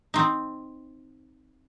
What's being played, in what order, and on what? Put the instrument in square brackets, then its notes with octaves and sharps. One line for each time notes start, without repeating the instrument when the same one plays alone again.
[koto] C4 D#4